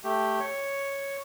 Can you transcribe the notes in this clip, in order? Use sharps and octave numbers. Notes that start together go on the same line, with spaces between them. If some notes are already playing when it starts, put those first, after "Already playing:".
A3 G4
C#5